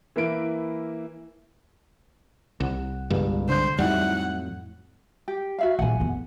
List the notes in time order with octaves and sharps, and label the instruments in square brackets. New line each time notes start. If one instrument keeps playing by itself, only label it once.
[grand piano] E3 A#3 E4 D7
[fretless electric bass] C2 [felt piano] F#5
[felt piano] G1 [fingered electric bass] C2 G#3 [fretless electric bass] G2
[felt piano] D3 G6 [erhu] C5
[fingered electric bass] F2 A2 F#3 [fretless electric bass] G3 [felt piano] D#4 E4 [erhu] F#5
[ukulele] G4
F#4 E5 F5
[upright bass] A#1 C4 [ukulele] F#5 G#5
[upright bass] F2 B3